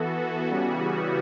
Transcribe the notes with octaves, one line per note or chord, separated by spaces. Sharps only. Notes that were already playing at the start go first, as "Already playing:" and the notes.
Already playing: E3 B3 F#4 A4
C#3 E3 G3 B3 F#4